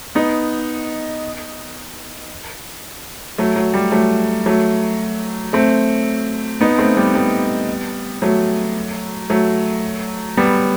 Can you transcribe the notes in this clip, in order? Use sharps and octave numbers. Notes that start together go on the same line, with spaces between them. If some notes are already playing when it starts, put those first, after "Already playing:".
B3 D#4
F#3 A3
F#3
G3
F#3 A3
F#3 A3
A3 C4
B3 D#4
A3 C4
G3 B3
G3 B3
F#3 A3
F#3 A3
G3 B3